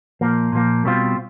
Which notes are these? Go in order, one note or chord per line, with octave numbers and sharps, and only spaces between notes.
A#2 F3 A#3
A#2 F3 A#3
B2 G3 C4 F4